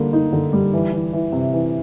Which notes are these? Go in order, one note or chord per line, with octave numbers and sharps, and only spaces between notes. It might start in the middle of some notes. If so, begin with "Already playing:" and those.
Already playing: D3 G3 A#3
D#4
D3
G3
E3
E3
E3
C3
E3